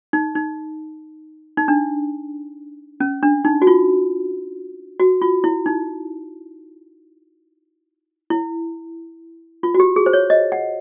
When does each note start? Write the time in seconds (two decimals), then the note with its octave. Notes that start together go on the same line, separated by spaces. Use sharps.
0.13 D#4
0.36 D#4
1.57 D#4
1.68 D4
3.00 C#4
3.23 D4
3.45 D#4
3.62 F#4
3.67 F4
5.00 F#4
5.22 F4
5.44 E4
5.66 D#4
8.30 E4
9.63 F4
9.74 F#4
9.80 G4
9.96 G#4
10.06 C5
10.13 C#5
10.30 D#5
10.52 F#5